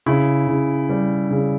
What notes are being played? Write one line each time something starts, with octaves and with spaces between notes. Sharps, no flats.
C#3 E4
C#3
G3
C#3